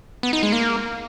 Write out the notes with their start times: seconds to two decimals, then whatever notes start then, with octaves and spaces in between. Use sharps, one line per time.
0.23 B3
0.33 D#4
0.43 G#3
0.53 A#3